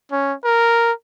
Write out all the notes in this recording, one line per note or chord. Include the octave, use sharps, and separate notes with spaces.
C#4
A#4